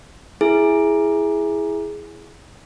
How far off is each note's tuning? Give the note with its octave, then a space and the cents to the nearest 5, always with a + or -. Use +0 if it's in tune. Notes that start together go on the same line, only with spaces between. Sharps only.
E4 +0 G#4 +0